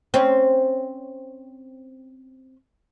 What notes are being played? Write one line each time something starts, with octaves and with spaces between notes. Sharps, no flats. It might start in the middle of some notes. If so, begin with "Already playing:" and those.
C4 C#4